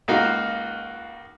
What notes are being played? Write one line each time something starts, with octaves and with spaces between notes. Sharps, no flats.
C#2 A#3 D#4 F4 F#4 F5